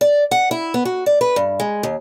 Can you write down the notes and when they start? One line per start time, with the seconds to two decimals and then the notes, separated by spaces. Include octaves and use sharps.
0.01 D5
0.31 F#5
0.51 E4
0.74 B3
0.85 F#4
1.06 D5
1.21 B4
1.36 G2
1.60 G#3
1.83 D#2